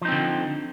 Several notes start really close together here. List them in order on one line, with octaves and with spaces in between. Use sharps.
F3 D#4 C4 D3